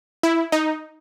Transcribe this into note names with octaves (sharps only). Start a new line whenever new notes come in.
E4
D#4